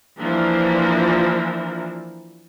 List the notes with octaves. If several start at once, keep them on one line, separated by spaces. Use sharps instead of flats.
E3 F3 A#3 D4 E4 A#4